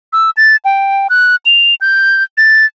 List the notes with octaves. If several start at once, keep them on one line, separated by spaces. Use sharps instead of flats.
E6
A6
G5
F#6
F7
G6
A6